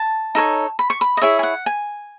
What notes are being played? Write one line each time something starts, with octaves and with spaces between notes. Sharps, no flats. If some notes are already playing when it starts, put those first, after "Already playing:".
Already playing: A5
D#4 A4 C#5
B5
C#6
B5
D#5
E4 G#4 C#5 E5
G#5
F#5
G#5